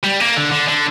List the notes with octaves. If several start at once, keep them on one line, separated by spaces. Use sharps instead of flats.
G3
A#3
D3
D3
D3